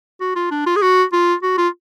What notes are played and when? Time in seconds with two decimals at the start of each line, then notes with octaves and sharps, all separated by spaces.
0.20 F#4
0.36 F4
0.51 D4
0.66 F4
0.76 G#4
0.82 F#4
1.13 F4
1.43 F#4
1.58 F4